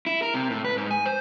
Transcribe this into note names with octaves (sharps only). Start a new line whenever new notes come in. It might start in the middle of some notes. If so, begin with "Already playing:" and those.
E4
A#4
C3
A2
B4
G#2
G#5
C5